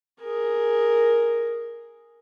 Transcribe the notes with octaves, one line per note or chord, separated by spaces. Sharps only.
G#4 A#4